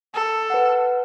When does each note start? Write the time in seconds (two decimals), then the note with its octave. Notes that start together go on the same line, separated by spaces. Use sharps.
0.14 A4
0.50 B4 F#5